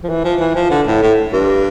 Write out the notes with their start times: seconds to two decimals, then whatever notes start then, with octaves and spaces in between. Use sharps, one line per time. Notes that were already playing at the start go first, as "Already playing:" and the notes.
0.04 F3
0.09 E3
0.24 F3
0.40 E3
0.55 F3
0.71 D3
0.87 A2
1.02 A2
1.33 G2